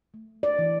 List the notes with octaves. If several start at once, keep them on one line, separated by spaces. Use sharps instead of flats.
A3
D5
E3